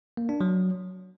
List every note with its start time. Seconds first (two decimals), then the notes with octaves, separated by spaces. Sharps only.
0.17 A#3
0.29 D4
0.41 F#3